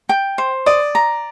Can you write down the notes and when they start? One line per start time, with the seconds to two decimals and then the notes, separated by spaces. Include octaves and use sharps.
0.09 G5
0.38 C5
0.66 D5 D#6
0.95 A#5